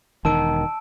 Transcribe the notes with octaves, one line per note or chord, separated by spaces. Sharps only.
E1 D#3 A5 E6 D7